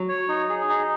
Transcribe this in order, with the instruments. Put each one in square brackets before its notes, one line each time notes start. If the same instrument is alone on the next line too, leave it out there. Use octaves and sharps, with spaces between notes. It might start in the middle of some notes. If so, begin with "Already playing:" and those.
Already playing: [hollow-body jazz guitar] F#3
[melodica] C#5
D#4
G#4
D#4